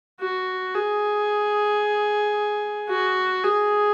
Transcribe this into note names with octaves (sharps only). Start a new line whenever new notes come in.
F#4
G#4
F#4
G#4